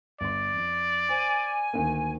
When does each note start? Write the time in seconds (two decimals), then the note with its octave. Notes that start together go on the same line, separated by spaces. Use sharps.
0.21 G1 D5 C6
0.54 F2
1.09 C5 G#5
1.73 D2 D#3 A#3